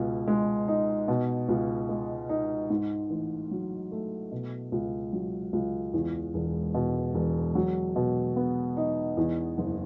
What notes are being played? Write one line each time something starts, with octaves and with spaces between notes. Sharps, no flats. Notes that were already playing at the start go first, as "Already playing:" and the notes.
Already playing: C#2 B2
G#3
D#4
B2
C#2
G#3
D#4
G#2
A1
F#3
A3
B2
C#2
F#3
C#2
E2
E1
B2
E1
F#3
B2
B3
D#4
E2
F#1